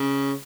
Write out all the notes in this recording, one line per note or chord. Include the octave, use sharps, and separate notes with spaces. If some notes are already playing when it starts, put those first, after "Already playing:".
Already playing: C#3